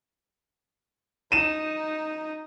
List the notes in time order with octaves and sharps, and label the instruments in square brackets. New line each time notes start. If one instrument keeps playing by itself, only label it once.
[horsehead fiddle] D#4 [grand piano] D#7 E7